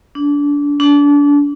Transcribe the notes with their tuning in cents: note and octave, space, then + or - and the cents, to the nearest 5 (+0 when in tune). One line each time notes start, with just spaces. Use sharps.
D4 -25
D4 -30